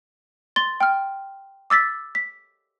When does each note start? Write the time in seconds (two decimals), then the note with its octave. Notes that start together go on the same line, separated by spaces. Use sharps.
0.56 C6 A6 G7
0.80 G5 F6
1.70 D6 E6 A6 B6
2.15 B6